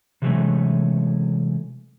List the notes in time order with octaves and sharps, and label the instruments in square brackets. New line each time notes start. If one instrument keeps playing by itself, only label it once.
[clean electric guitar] C3 E3 F#3 G#3 A3 C#4